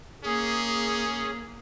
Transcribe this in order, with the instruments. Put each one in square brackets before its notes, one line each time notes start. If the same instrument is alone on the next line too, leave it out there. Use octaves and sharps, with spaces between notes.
[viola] A#3 [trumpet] C#4 [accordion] G#4